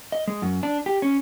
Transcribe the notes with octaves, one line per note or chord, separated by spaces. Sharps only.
D#5
G#3
F#2
D4
G4
C#4